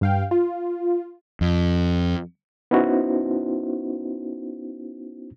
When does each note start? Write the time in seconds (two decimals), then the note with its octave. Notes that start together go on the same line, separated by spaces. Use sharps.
0.01 G2 F5 G5
0.31 F4
1.41 F2
2.71 B3 C#4 D#4 E4 F#4 C5